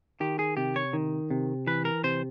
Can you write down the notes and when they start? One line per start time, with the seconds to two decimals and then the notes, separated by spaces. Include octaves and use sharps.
0.20 D#3 G4
0.39 G#4
0.57 C3 G4
0.76 C#5
0.93 D#3
1.31 C3
1.67 E3 B4
1.85 A#4
2.04 C3 C5